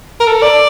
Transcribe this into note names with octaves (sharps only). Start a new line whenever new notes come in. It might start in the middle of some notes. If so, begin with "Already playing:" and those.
A#4
A4
D5